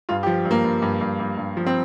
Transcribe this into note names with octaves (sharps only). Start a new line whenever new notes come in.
G2 F4
G4
F3
G2
A#3
G2
G2
G2
G2
G2
F3
C4